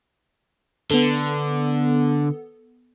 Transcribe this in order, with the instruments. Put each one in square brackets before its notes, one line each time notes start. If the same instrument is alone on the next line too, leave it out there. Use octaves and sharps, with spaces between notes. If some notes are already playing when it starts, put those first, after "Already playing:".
[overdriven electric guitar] D3 [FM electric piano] B3 A4